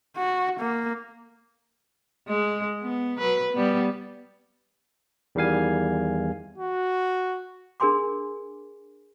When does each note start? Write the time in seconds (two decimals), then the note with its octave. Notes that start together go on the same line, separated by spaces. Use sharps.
0.17 F#4
0.60 A#3
2.28 G#3
2.81 B3
3.18 F#3 B4
3.53 G3 B3
5.35 E2 D#3 G3 F5 G#5
6.58 F#4
7.80 D4 G#4 A#4 G#5 C6 D6